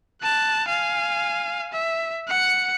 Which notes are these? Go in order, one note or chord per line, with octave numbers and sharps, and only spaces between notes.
A5 F#6
F5 G#5
E5
F#5 C#7